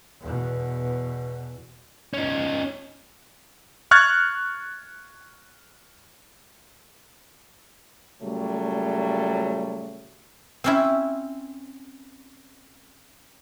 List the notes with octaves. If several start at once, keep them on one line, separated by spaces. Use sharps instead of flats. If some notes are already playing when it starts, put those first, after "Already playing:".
E2 B2
C#4 D#4
C#6 F6 F#6 G#6 A6
A#2 C#3 F#3 G3 A3
C4 C#4 E4